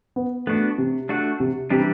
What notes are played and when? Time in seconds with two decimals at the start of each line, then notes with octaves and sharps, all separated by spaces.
0.16 B3
0.47 A3 B3 D4 F#4
0.78 C3
1.09 A3 D4 F#4
1.40 C3
1.70 C3 E3 G3 D4 G4